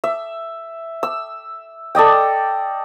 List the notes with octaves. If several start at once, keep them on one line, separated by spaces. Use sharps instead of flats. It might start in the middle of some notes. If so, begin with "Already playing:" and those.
E5
E6
A4 D5 D#5 G5